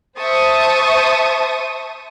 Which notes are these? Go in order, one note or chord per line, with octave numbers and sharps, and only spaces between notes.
C5 E5 A5 C#6 D#6